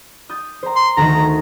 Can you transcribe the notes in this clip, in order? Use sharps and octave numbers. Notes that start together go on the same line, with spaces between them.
D#6 G6 A6
C5 A#5
C6
D2 D#3 A#5